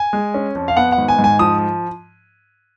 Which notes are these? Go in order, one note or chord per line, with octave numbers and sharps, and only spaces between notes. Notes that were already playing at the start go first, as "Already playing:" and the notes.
Already playing: G#5
G#3
C#4
F2
F5
B3 F#5
F#5
G#1
G#5
G#2
G#5
F3 D#6